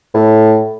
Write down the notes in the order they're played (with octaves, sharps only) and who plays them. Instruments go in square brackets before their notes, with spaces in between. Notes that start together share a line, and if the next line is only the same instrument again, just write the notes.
[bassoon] A2